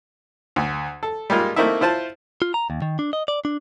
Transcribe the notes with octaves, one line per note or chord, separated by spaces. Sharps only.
D2
A4
G3 G#3 A#3 F4
A3 A#3 C4 D#4 E4 E5
E4 F4 C5 A5
F4
A#5
D#2
D#3
D4
D#5
D5
D4